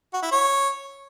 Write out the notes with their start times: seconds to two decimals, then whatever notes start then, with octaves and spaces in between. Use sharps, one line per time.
0.14 F#4
0.23 E4
0.32 C#5